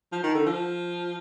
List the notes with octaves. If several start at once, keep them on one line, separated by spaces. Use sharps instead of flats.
F3
D#3
D3
F3